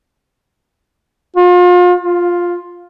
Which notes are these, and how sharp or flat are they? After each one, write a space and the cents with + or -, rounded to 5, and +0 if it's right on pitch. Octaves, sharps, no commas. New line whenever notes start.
F4 +35
F4 +5